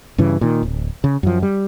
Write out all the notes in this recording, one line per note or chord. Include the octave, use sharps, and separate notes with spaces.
G2 C#3 E3
A#2 D#3
D1
C#3
F#2 F3
G3